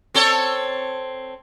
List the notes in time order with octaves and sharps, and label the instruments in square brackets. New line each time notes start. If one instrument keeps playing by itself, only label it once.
[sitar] C4 A4 C#5